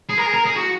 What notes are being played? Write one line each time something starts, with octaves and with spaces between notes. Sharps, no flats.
G#4
A#4
G#4
A#4
G#4
F#4